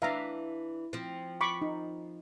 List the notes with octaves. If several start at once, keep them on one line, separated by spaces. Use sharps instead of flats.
E3 D4 E5 F5 A#5
F3 C4
B5 C#6 D6
D#4